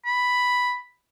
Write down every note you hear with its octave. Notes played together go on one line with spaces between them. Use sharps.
B5